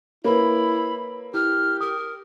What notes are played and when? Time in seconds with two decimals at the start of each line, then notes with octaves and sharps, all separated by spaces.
0.24 A#3 E4 B4 C#5 B5
1.34 E4 G4 F6
1.81 A#4 D#6